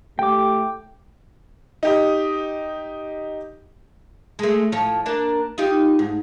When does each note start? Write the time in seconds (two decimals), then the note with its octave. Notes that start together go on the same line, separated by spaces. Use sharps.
0.19 A2 A3 G4 G5 D6
1.83 D#4 G4 D#6
4.39 G#3 A3
4.72 A2 F3 C#5
5.06 A#3 D4
5.58 D#4 F4 G4
5.99 G#2